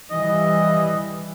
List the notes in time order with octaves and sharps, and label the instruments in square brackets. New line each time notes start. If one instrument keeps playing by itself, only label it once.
[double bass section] E3 G3 [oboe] D#5